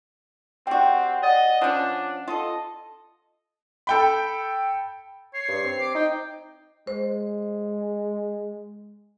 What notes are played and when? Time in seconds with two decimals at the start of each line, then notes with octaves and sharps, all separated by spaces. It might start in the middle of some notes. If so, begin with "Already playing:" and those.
0.67 G3 C4 F#4 G5
1.23 D5 D#5 F#5 A6
1.62 F3 C#4 D4
2.28 F4 A4 D#5
3.87 A4 G5 B5
5.33 C#5 C7
5.48 G2
5.64 C4
5.80 D6
5.95 D#4 G5
6.87 G#3 C5